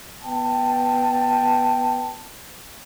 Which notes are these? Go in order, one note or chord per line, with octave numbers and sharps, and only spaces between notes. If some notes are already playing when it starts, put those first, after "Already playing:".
B3 G5 A5